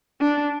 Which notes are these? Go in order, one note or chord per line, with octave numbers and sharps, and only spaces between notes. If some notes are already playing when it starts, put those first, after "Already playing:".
D4